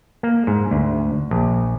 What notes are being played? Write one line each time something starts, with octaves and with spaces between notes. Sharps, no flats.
A#3
G#2
D2
A#1